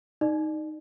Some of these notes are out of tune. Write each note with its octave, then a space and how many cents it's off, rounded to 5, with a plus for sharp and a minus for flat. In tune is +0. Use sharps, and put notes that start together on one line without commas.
D#4 +0 D5 +30